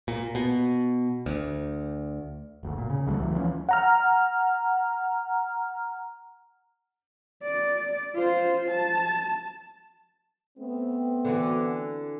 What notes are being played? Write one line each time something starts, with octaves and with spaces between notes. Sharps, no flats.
A#2
B2
D2
F#1 D2
A#2
C#3
D2 F#3 G3 A3
D2 E3 F#3
E3 F3 C4 C#4
F#5 A#5 F6
D5
F4 C5
A5
A3 B3 C4
D3 E3 F#4